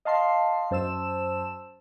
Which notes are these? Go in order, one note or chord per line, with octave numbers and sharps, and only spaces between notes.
D#5 F5 A5 C6 C7
F#2 C5 A5 E6 E7